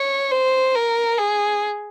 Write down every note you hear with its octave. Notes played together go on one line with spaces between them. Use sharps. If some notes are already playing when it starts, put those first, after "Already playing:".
Already playing: C#5
C5
A#4
G#4